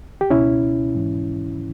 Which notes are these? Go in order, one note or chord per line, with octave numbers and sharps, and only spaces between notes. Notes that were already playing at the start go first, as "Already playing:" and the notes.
G4
C#2 B2 C#4 E4
G#2 E3